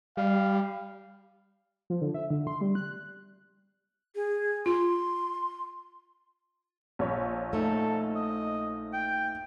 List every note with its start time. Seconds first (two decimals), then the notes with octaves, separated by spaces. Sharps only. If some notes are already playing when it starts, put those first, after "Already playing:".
0.17 G3 F5
1.90 F3
2.01 D3
2.14 E5
2.30 D3
2.47 C6
2.61 G3
2.75 F#6
4.15 G#4
4.66 F4 C6
6.99 A#1 C#5
7.53 A3 D#4 A4
8.16 D#5
8.93 G5